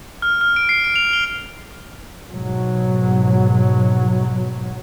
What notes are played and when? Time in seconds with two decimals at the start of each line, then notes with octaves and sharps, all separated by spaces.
0.22 F6
0.41 F6
0.56 D7
0.69 C7
0.84 D7
0.96 F7
1.13 G7
2.30 G#2 B2 F#3